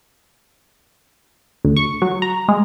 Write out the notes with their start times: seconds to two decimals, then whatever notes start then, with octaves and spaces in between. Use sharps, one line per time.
1.65 D2
1.77 C#6
2.02 F#3
2.22 A#5
2.49 G#3